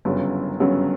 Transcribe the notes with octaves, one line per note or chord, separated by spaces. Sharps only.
G1 F#2 C#3 F#3 B3
G1 F#2 C#3 F#3 B3